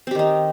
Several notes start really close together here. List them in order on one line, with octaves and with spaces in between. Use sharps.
C4 G4 D#3 D#4